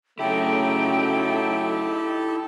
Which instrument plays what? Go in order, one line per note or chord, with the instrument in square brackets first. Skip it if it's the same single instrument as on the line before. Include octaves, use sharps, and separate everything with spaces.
[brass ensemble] C#3 F#3 A3 [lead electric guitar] D#4 E4 [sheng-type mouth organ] G4 A4 [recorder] G5